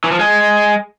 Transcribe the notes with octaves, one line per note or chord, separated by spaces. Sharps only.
E3
F3
G#3